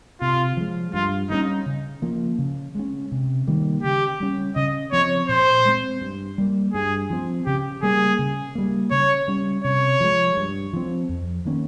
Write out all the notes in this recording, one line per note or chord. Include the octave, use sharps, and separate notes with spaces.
C3 F4
F3 G#3
G2 F4
G3 A#3 C#4 D#4
C#3
F3 A#3
C#3
G#3 C#4
C3
D#3 G3 A#3
C#3 G4
G3 C#4
C#3 D#5
F3 C4 C#5
A#2 C5
G#3 C4
G2
G3 A#3
G2 G#4
F3 C4
C#3 G4
G3 A#3 G#4
C#3
G3 A#3
C#3 C#5
G3 C#4
C3 C#5
F3 G#3
G2
F3 C4
F2
D#3 A#3 C#4